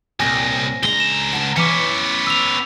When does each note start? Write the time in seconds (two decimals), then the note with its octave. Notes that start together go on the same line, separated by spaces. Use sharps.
0.20 C2 A#2 C4 C#5 G#5 A#6
0.83 C#2 G#3 D4 A#5 G7
1.00 E7
1.33 F#5 A5
1.57 E3 B3 C#4 D6 B6 C#7
2.27 E6 F7